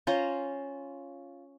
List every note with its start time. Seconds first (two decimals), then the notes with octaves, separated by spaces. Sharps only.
0.07 C#4 F4 C5 A#5